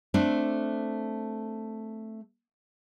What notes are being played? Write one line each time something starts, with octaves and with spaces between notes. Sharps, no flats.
A3 C4 D4